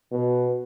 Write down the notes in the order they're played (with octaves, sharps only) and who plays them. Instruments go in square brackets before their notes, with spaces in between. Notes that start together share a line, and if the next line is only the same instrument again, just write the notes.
[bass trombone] B2